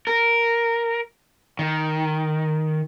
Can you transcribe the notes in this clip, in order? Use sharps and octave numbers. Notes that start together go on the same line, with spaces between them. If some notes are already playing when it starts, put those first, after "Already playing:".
A#4
D#3